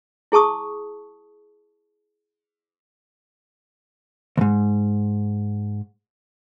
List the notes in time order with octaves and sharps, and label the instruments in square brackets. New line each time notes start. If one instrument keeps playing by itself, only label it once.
[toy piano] E4 G#4 A5 C#6 D#6
[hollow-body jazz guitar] D2 G#2